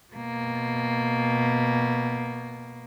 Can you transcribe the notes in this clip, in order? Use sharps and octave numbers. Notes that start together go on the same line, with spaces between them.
B2 A#3